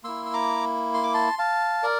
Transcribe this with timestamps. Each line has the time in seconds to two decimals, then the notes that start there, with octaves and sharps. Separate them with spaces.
0.04 A#3 E4 C6 E6
0.25 E6
0.33 A#5 D6
0.94 C6
1.04 D6
1.13 A5 C6
1.39 F5 A5
1.83 A#4 D5